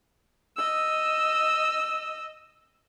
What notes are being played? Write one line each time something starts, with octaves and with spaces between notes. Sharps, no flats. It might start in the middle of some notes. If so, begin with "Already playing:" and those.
D#5 E6